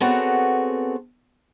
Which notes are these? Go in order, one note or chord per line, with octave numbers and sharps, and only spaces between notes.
B3 C4 F#4 G#4 A4 C#5